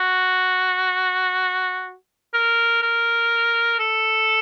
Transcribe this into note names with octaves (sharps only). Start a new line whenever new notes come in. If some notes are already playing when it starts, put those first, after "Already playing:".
Already playing: F#4
A#4
A#4
A4